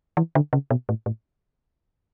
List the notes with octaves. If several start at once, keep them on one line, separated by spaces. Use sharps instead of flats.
E3
D3
C#3
B2
A2
A2